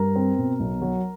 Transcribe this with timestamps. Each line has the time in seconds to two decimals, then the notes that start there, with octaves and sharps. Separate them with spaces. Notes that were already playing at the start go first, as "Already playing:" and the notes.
Already playing: G2 A#4 A#5
0.16 C4
0.39 B2
0.60 B1
0.82 F#3